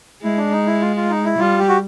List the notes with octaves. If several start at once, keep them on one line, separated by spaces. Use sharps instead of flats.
G#3 E4
D4
D#4
E4
F4
F4
D#4
E4
G3 F4
G4
F#4